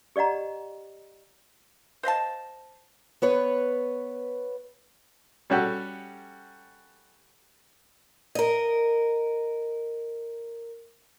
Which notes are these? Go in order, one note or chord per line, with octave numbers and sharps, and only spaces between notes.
G4 D5 D#5 F#5 A#5
C5 D#5 F5 A5
B3 B4 C#5
G3 C#4 F#4 G4 A4
A#4 D#5